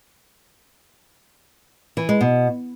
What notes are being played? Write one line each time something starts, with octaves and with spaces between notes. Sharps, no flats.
E3
G#3
B2